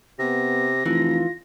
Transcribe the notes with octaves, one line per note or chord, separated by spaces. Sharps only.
C3 B3 A#6
F1 E3 F4